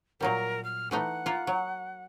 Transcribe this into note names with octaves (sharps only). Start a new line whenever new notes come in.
A#2 F#3 G3 A#4
F6
E3 A3 D#4 F#5
A#3 F4
F#3